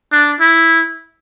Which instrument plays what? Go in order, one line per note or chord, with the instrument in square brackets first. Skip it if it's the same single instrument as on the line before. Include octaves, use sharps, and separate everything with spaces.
[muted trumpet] D4
E4